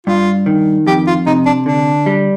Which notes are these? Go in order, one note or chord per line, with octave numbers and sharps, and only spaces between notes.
G2 F4
D#3
F2 G4
F4
C3 D#4
D4
D3 D4
G3